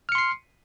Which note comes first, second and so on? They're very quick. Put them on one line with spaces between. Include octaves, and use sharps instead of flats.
F6 C#7 C6 C7